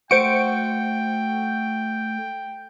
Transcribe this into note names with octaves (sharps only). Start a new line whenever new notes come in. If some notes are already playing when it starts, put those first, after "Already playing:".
A3 F#4 C5 G5 C#7 D7